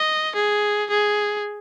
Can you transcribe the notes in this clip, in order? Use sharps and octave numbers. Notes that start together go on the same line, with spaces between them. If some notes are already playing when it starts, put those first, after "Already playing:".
Already playing: D#5
G#4
G#4